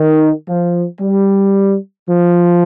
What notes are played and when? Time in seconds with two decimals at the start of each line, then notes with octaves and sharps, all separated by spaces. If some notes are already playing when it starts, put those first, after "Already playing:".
Already playing: D#3
0.47 F3
1.01 G3
2.08 F3